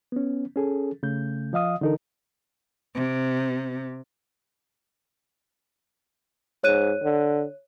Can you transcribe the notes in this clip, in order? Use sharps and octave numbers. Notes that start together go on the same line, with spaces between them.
B3 C#4
C#4 G#4 A4
C#3 A3 G6
F3 D#5 F5 D#6
D3 E3 D#4 A4 A#4
C3
G#2 C#5 F#6 D#7
D3